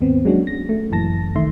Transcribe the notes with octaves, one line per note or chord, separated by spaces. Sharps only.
D#2 G#2 B3 C4
F#3 G#3 A#3 C#4 D4 F#4
A#6
A3
G1 F#2 A#2 E3 A5 A#6
G1 C2 D#3 A3 E5 C6